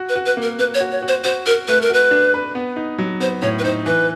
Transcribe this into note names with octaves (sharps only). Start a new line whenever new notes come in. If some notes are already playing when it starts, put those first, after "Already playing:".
Already playing: F#4
B4
F#4
B4
A#3
A#4
A#3 B4
C#5
F#4
C#5
F#4
C5
F#4 C5
F#4 A#4
A3 B4
A#4
F#4 B4
D4
B4
B3
D#4
F#3
B3 C5
A2 C#5
B4
D#4 C5
E3 B4